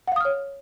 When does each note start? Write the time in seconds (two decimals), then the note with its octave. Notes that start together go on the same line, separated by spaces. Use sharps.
0.08 F#5
0.12 F5
0.16 D#6
0.21 F6
0.25 C#5